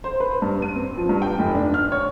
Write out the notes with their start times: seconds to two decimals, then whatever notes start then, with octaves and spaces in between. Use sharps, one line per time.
0.04 C5
0.20 B4
0.42 G2
0.62 D#7
0.76 C4
0.98 F3
1.09 G2
1.22 G5
1.39 F1
1.54 D4
1.74 F6
1.92 C#5